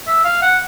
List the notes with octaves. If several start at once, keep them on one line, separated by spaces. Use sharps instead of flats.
E5
F5
F#5